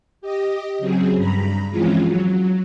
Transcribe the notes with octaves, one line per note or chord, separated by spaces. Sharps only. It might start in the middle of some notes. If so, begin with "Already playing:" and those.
G4 D#5
C#3 F#3 C4 G#4
G2 A#5 B5
E3 F3 G#3 C4 C#4 F4
F#3